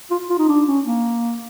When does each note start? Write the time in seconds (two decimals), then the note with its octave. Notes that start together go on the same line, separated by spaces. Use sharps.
0.11 F4
0.30 F4
0.39 D#4
0.48 D4
0.67 C#4
0.86 A#3